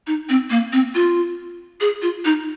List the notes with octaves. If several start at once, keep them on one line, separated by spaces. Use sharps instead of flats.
D#4
C4
A#3
C4
F4
G#4
F4
D#4